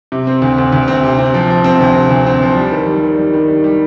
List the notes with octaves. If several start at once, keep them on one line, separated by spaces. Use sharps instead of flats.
C3
C4
D2
D2
D2
C4
C3
C4
F3
F3
C4
D2
C3
D2
C4
F3
G3
D#3
G3
D#3
G3
D#3
G3
G3